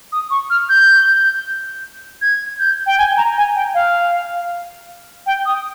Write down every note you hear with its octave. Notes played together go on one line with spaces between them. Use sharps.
D#6
C#6
F6
G6
G#6
G6
G5
G#5
A#5
G#5
G5
F5
G5
D#6